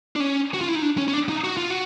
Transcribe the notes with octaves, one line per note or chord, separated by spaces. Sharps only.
D4
C#4
F#4
F4
E4
D#4
D4
C#4
C#4
D4
D#4
F#4
F4
F#4